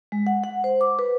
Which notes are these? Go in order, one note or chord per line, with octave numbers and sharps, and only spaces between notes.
G#3
F#5
F#5
C5
D6
B4